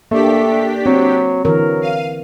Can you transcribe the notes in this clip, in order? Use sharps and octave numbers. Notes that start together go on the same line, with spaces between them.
A3 A#3 D4 G4 B6
F#3 C4
D3 E3 F#3 A#4
F5 D#7